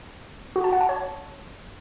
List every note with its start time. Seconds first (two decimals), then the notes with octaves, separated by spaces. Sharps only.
0.56 F#4
0.64 A5
0.72 F#5
0.81 A5
0.89 C#5